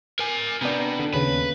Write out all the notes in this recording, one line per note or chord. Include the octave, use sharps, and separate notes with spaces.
A#4 G#5
C3 B3 D4 G5 A#5
D3
D#2 C#3 B4